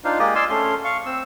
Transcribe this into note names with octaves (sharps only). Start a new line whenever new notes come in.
D4 D#4 F4 C5 F5
G#3 A#3 G4 D5 D#5
D5 D#5 F5 G#5 C6 E6
A3 C#4 C6
F5 C#6
C4 E6